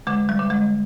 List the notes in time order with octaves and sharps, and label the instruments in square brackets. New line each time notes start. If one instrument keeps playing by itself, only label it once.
[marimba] D3 G#3
G3
D3
G#3